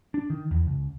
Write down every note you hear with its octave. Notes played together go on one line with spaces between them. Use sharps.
D4
D#3
E2
C#2